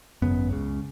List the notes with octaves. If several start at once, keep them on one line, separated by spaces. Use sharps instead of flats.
G#1 F#2 C#3 B3
C#2 C#3